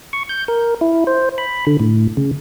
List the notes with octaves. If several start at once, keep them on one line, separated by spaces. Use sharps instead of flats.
C#6
G6
A#4
E4
C5
B5
D3
A2
C#3